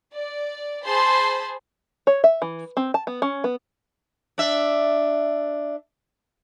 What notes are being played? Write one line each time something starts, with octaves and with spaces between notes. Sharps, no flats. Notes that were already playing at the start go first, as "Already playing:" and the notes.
D5
G#4 C5 A5 B5 C6
C#5
E5
E3
C4
A5
B3
C#4
B3
D4 E5